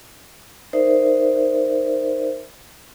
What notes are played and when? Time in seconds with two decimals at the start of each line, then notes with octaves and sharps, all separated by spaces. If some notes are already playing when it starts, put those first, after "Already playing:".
0.73 D#4 A#4 C5 D5 E5